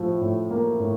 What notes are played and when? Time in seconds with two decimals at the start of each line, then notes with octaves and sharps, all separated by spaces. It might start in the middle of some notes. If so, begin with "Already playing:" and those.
Already playing: A2 F3
0.21 A2
0.51 A#3
0.80 A2